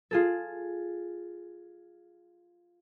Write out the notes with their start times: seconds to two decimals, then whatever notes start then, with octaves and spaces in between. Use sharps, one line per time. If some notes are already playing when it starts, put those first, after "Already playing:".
0.11 F4 G#4 A4